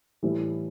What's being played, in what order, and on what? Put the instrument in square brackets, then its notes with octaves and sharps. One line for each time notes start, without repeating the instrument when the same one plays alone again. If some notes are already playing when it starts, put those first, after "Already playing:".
[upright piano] A2 E3 G3